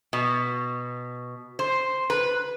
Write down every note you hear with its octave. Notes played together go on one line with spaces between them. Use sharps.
B2
C5
B4